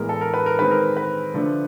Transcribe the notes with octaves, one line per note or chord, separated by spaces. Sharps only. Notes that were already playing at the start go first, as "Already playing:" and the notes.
Already playing: A2 E3 G#3 B3 A#4
A4
A#4
B4
A#4
D#3 G#3 C4 B4
A#4
B4
D3 F3 A3 D4